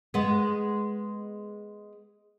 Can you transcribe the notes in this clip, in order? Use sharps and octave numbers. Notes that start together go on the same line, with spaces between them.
G#3 B3